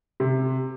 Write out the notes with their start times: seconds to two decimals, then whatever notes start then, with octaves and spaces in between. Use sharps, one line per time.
0.20 C3